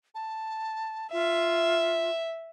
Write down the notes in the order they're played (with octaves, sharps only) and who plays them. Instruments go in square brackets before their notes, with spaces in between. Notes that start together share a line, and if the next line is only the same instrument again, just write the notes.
[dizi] A5
[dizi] F4 [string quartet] E5